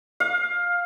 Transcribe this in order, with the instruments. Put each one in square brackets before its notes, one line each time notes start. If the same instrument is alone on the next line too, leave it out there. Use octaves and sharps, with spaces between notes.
[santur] F5